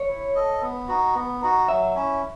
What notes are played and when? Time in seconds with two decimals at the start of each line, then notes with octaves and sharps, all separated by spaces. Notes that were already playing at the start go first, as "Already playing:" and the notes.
Already playing: C#5
0.08 E4
0.35 A4 D#5
0.61 B3
0.88 D#4 F#4
1.15 B3
1.42 D#4 F#4
1.68 F#3 E5
1.95 C#4 E4